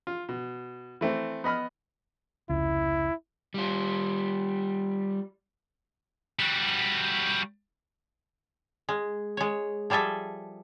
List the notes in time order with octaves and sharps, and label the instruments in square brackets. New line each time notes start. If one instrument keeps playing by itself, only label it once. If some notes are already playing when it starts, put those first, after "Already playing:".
[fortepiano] F4
B2
E3 A3 C4
B3 D#5 B5 F6
[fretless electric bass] F1 C#2 [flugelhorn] E4
[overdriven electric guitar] G3 F4
[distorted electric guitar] G3 F#4
[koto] G#3
G#3 C#5
F3 G3 G#4 A4 E5